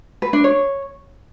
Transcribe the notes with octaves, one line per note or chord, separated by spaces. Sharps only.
B4
D4
C#5